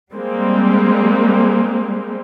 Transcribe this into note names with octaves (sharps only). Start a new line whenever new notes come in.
G3 G#3 A#3 C4